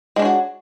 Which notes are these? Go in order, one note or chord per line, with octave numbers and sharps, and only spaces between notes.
G#3 D4 F#4 C#5